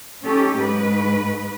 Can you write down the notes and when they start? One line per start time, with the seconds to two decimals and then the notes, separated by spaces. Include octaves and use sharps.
0.24 C#4 D#4 G4 A4
0.59 G#2 B4